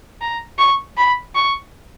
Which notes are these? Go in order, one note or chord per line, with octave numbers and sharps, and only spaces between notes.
A#5
C#6
B5
C#6